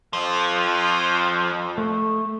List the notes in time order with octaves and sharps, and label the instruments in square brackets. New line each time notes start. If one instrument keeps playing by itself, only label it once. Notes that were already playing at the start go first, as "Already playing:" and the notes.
[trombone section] F2 [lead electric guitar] F3
[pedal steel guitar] A3